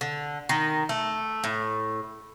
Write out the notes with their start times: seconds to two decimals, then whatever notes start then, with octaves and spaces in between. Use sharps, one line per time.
0.01 D3
0.49 D#3
0.89 A3
1.44 A2